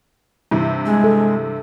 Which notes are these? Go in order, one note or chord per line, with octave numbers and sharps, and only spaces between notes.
G2 C3 E3
G#3
A4